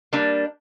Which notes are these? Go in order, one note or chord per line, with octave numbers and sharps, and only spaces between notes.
G3 A#3 D4